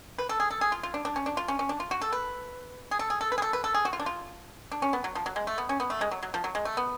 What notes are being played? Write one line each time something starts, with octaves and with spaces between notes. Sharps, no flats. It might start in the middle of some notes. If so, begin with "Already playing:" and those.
B4
A4
G#4
A4
G#4
F4
F4
D4
D4
C#4
D4
F4
C#4
C#4
D4
F4
F#4
A4
B4
G#4
A4
G#4
A4
B4
G#4
A4
B4
A4
G#4
F#4
F4
D4
F4
D4
C#4
B3
F#3
F3
F#3
G#3
A3
B3
C#4
B3
A3
G#3
F#3
F#3
F3
F#3
G#3
A3
B3